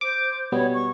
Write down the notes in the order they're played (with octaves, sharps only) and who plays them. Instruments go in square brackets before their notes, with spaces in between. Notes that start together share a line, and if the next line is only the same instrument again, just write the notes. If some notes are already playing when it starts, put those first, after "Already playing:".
[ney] C5 [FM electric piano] D6
[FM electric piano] B2 G3 B3 [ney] C#5
[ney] C#6